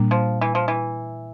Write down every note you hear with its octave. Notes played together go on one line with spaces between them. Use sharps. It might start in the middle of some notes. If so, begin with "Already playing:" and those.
Already playing: A#2 G3 A#3 D4
F3
E3
F3
E3